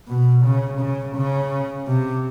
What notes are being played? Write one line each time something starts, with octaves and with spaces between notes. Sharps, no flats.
B2
C#3
C#3
C#3
C3